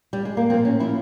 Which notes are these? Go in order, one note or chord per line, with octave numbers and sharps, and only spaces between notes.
G3
G#3
A#3
A#2 F3 C4
C#4
A#2 F3 E4